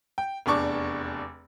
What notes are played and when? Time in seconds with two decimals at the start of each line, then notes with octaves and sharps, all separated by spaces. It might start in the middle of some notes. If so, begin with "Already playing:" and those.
0.18 G5
0.46 F1 E2 D4 C#6 D6